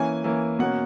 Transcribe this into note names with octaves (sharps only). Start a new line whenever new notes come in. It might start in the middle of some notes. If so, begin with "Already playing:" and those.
Already playing: E3 A#3 C#4 G#5
E3 A#3 C#4
B2 A#3 C#4 F#5